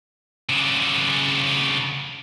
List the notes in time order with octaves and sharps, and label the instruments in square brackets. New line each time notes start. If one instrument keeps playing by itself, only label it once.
[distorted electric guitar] C#3 D4